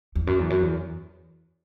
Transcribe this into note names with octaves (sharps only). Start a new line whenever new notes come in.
E2
F#2
E2
F#2
E2